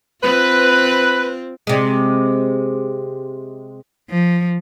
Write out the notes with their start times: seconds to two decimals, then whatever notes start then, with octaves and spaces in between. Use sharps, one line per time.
0.23 C4 F4 B4
1.67 C3 G#3
4.10 F3